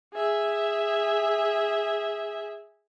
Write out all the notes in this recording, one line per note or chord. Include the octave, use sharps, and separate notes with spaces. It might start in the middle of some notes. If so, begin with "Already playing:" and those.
G#4 E5